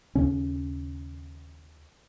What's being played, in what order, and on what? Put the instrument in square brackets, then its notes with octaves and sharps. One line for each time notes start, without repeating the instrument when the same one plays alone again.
[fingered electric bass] D#2 C#3 C#4